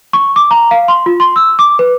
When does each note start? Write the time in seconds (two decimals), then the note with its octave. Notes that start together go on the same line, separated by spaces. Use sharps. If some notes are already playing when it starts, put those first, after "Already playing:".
0.13 C#6
0.36 D6
0.51 A#5
0.71 F5
0.88 C6
1.06 F4
1.20 C6
1.36 E6
1.59 D6
1.79 B4